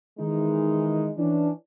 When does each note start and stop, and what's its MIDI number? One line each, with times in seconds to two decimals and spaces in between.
0.19 1.11 51
0.19 1.11 52
0.19 1.11 56
0.19 1.11 63
1.17 1.50 52
1.17 1.50 61
1.17 1.50 62